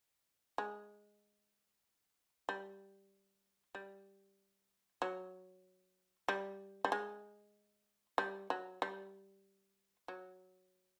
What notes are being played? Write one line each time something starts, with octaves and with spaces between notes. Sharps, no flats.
G#3
G3
G3
F#3
G3
G3
G#3
G3
F#3
G3
F#3